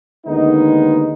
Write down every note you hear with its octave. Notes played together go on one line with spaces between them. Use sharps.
D#2 D3 G#3 B3 D#4